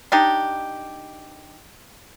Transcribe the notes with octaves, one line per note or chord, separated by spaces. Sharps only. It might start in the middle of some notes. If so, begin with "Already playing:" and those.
D4 D#4 G4